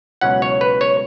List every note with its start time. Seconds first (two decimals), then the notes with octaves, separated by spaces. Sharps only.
0.21 C#2 B2 F#3 C#4 E4 F#5
0.42 C#5
0.61 B4
0.81 C#5